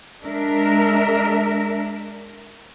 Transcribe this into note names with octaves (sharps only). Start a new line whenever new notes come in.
G#3 D4 A#4 E5